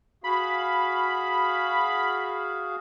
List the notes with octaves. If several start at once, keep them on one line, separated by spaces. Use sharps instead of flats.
F#4 G#4 F5 B5